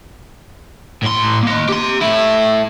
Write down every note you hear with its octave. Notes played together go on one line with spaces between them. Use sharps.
A2 C6
A#3 D#5
G4 C6
A2 E4